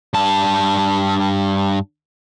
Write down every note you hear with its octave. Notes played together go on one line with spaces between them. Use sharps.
G2 A5